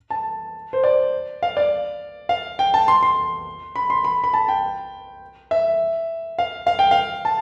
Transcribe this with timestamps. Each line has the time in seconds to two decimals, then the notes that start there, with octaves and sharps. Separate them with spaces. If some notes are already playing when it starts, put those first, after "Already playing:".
0.10 A5
0.73 C5
0.84 D5
1.43 F5
1.57 D5
2.29 F5
2.59 G5
2.74 A5
2.88 C6
3.03 C6
3.76 B5
3.90 C6
4.05 B5
4.24 B5
4.34 A5
4.48 G5
5.51 E5
6.39 F5
6.67 F5
6.79 G5
6.91 F5
7.25 A5